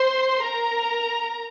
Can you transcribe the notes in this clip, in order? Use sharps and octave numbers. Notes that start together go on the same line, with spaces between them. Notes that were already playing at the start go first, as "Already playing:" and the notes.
Already playing: C5 C6
A#4 A#5